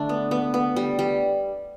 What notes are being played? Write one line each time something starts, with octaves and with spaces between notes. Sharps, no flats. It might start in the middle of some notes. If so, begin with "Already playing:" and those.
Already playing: D3 A3 D4
B3
B3
B3
G3
G3